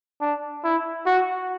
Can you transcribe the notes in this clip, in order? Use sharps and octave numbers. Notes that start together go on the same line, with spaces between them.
D4
E4
F#4